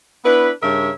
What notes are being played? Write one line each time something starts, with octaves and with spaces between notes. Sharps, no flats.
B3 D4 E4 B4
G2 C#3 A#4 C#5 E5